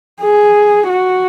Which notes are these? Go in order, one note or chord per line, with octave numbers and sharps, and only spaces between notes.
G#4
F#4